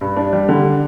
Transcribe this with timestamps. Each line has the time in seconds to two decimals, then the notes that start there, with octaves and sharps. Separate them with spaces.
0.01 G2
0.16 D4
0.33 G3
0.49 D3